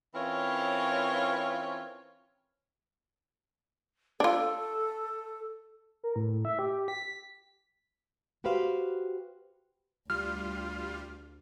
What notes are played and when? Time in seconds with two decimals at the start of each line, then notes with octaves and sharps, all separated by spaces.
0.14 E3 C4 C#4 F4 A#4 C#5
4.20 D4 F4 A4
6.04 A#4
6.16 A2
6.45 E5
6.59 G4
6.72 G4
6.88 B6
8.44 F#4 G4 B4 C5 F5
10.10 D2 G3 F4 F6